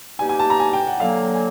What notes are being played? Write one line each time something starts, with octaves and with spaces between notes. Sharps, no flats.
B2 G3 A#3 D#4 G4 G#5
G#5
A5
A#5
G#5
G5
F#5
D3 F#3 A#3 F5
G#5